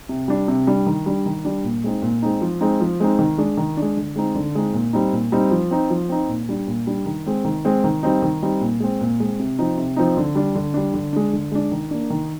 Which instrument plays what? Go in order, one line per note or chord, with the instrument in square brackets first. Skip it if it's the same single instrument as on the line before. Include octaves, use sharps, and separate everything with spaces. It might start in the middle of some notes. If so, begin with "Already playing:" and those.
[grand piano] C3
G3 D4
C3
G3 D4
D#3
G3 D4
D#3
G3 D4
A#2
G#3 C4 D#4
A#2
G#3 C4 D#4
F3
G#3 C4 D#4
F3
G#3 C4 D#4
D#3
G#3 D4
D#3
G#3 D4
D3
G#3 C4 D#4
D3
G#3 C4 D#4
A#2
G3 C4 D#4
A#2
G3 C4 D#4
F3
C4 D#4
F3
C4 D#4
A#2
G3 D4
A#2
G3 D4
D#3
G#3 C4
D#3
G#3 C4
D#3
G3 C4 D#4
D#3
G3 C4 D#4
A#2
G#3 C4
A#2
G#3 C4
C3
F3 C4 D#4
C3
F3 C4 D#4
D3
G3 D4
D3
G3 D4
D3
G#3 D4
D3
G#3 D4
D#3
A#3 D4
D#3